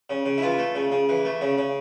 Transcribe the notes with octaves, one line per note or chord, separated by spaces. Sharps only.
C#3
C#3
E4
E3 F4
A3
C#3
C#3
E3
A3
C#3
C#3